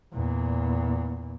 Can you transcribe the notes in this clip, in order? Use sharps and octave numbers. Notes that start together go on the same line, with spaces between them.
E2 A#2